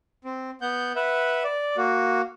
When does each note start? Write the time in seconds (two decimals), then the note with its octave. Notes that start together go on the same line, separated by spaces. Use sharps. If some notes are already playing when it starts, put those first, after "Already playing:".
0.24 C4
0.61 B3 F#5 G6
0.96 B4 E5 F#5
1.44 D5
1.77 A#3 F#4